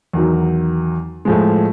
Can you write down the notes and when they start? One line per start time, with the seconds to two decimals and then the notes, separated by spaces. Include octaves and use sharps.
0.13 E2 D#3 F#3
1.25 A2 F3 G#3